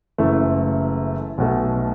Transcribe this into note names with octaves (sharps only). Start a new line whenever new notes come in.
F#1 F#2 E3 A3
B1 B2 A3